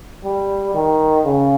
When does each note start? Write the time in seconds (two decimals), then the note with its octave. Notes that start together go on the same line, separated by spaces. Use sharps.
0.24 G3
0.74 D#3
1.25 C#3